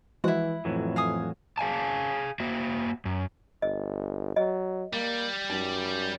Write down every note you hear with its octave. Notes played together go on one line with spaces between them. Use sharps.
E3 F3 G#3 E4 F#4 F#5
F2 A2 E3 F#3
F5 G#5 D#6
G#4 F5 G#5 A5
A#3 F#4 E5
F#2
G1 D#5
F#3 D#5
G3 A#3
F#2 D#4